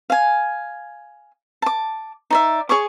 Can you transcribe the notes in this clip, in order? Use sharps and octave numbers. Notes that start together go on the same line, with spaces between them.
F5 G#5
A5 D6
D#4 D5 E5
G#4 C#5 C#6 D6